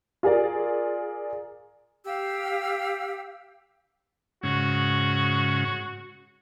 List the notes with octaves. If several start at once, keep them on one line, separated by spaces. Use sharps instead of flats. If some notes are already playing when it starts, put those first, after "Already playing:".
F4 G#4 A#4 D5
G4 F5 E6
G#2 C#3 F#4